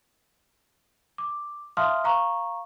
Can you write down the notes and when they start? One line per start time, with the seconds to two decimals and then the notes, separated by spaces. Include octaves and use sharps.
1.18 D6
1.77 E5 F5 A5 C6 D#6 F6
2.04 F5 A#5 C#6